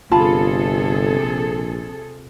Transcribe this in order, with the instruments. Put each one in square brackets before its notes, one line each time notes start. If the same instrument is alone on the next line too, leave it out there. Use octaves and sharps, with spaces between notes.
[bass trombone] G1 [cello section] C3 G#4 A4 [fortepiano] F4 [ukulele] A5 B5
[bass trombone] A#1